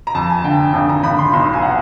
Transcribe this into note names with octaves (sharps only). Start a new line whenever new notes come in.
A#5
F2 A5
G#5
D3 G5
G#5
G#1 A5
A#5
G#1 B5
C6
B1 C6
G#5
F#5